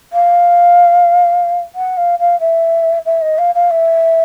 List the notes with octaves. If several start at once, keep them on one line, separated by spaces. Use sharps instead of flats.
F5
F#5
F5
F5
E5
E5
D#5
F5
F5
E5